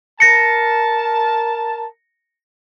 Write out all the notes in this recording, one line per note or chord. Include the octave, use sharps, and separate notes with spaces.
A#4 A5 A#6 C#7